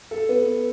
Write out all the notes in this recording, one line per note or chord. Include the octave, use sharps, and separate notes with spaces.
A4
B3